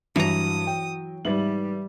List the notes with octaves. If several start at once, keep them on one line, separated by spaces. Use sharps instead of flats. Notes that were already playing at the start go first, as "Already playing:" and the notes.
G2 E3 F#3 A#5 D#6
G5
G#2 G3 B4 E5 F#7